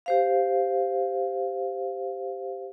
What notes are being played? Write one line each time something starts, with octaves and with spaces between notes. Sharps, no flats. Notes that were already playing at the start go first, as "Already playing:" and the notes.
G4 C5 F5